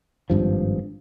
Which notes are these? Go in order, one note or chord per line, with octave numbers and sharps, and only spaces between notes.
G#1 G2 F3